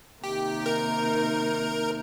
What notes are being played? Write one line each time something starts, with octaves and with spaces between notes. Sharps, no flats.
C3 D#3 A#3 D#4 G4
A#4